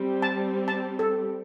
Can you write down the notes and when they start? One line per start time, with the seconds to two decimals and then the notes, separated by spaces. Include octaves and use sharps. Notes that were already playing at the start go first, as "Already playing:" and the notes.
Already playing: G3 C4 G4
0.22 A5
0.68 A5
0.99 A4